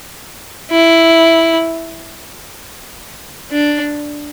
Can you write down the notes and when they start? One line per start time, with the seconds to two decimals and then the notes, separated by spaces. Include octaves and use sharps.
0.71 E4
3.52 D4